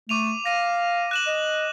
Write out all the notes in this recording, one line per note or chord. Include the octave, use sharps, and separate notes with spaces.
A3 D6 D#7 F7
F5 A#6 D#7
F#6 E7 F#7
D#5